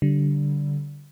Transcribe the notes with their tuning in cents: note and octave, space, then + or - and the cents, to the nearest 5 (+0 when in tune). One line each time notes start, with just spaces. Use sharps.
D3 -15 G3 -20